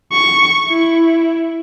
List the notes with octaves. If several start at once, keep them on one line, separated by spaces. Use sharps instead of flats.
C#6
E4